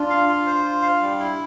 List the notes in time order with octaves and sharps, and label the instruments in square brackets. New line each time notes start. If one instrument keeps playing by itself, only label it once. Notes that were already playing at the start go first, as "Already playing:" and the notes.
Already playing: [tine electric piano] D4 [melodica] F4
[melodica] F5
F4
C5
F4
F5
G3
E4